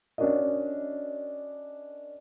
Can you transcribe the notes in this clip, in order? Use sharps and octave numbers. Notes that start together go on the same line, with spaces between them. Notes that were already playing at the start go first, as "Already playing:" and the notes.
C#4 D4 F#4 A#4 D#5